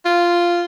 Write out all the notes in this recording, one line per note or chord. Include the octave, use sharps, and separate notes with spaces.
F4